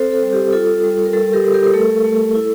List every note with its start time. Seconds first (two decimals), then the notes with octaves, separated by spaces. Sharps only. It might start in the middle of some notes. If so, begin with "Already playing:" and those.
Already playing: C4 A4 C5
0.12 A4
0.22 G3
0.33 G4
0.53 F4 A4
0.84 G3
1.05 A#4
1.13 G3 A4
1.33 G4 A#4
1.44 G3
1.54 G4 A#4
1.64 A#4
1.74 A3 A4
2.04 A3
2.35 E4